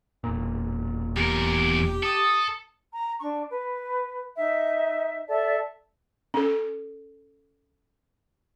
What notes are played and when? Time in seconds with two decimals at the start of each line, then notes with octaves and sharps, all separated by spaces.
0.24 E1 A#2
1.17 E2 G4 A#4
2.03 A4 D#6
2.93 A#5
3.19 D4 C#6
3.47 B4
4.35 D#4 E5
5.27 A4 D5 E5 A5
6.34 C#4 A4